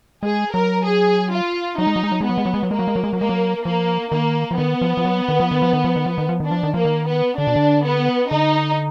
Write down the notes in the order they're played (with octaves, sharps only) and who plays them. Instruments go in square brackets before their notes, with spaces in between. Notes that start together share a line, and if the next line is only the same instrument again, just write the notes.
[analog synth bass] G#3 [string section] G#4
[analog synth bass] F#3 [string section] A#4
[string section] G#4
F4
[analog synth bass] F#3 [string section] D#4
[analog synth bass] G#3
F#3
G#3
F#3
G#3
[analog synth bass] F#3 [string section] B3
[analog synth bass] G#3
F#3
G#3
F#3
[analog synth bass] G#3 [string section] A#3
[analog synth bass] F#3
G#3
F#3
G#3
F#3
[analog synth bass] G#3 [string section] A#3
[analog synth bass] F#3
[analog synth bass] F3 [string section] A#3
[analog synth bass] D#3 [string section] A#3
[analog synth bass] F3
[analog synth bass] D#3 [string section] B3
[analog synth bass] F3
F3
F#3
D#3
F3
D#3
F3
D#3
F3
D#3
F3
D#3
F3
D#3
[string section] D4
[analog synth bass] F3
D#3
[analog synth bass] F3 [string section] A#3
[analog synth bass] D#3
[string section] B3
[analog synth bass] D3 [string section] D4
[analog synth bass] B2
D3
[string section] B3
[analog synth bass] D3 [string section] D#4